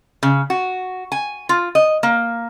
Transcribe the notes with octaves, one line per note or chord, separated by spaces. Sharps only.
C#3
F#4
G#5
F4
D#5
A#3